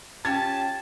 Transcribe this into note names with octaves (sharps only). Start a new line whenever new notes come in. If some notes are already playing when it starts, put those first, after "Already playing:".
C#4 F4 G4 A5 G#6